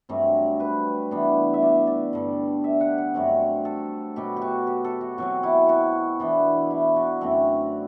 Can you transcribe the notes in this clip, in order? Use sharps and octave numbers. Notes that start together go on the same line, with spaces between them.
G2 F#3 A3 C4
B4
E3 B3 D4
E5
D5
D5
G2 D3 G3
E5
F#5
F#5
G2 F#3 A3 C4
A4
B2 F#3 B3 G4
G4
F#4
G4
A4
F#4
B2 F#3 C4 F#4
E4
F#4
E3 B3 D4
E4
F#4
F#2 D3 A3 C4